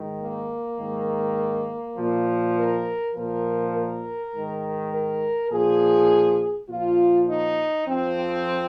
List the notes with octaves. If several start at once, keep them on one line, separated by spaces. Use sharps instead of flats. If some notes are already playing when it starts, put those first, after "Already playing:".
Already playing: G#2 D#3
A#3
G#2 D#3
A#2 F3
A#4
A#2 F3 A#4
A#4
G#2 D#3
A#4
A#2 F3 G#4
A#2 F3 F4
D#4
F2 F3 C4